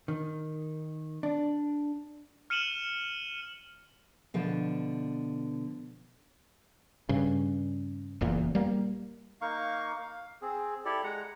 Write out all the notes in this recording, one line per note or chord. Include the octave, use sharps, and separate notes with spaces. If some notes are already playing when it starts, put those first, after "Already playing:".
D#3
D4
F6 C#7 D#7 E7 F#7 G7
B2 D3 F3
G2 C#3
F#1 E2 A#2
G3 A#3
A#3 D#4 F5 C#6
F5
C4 G#4
E4 G4 A4 D5
G#3 F#5 A#5